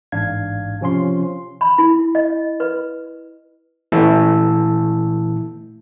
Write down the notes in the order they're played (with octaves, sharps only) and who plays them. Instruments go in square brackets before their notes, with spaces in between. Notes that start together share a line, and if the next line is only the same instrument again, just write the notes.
[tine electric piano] A1 G#2 D4 F5 G#6
C3 F3 C#4 F4 C6
[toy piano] B5
E4
D#5
B4
[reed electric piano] A#2 E3 A3 E4 A5 E6